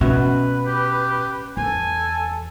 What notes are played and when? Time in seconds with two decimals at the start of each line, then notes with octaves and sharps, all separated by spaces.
0.01 B2 C#4 F#4 B4 E5
0.66 G4
1.57 E2 A4 G#5